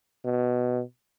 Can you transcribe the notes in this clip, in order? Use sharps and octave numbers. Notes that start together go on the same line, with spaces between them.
B2